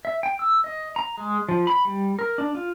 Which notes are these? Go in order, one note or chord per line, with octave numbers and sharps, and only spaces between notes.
E5
G5
E6
D#5
A#5
G#3
F3
B5
G3
A#4
D4
F4